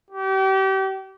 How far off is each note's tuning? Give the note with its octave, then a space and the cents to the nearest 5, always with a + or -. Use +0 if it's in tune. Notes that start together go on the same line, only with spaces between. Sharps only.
G4 -35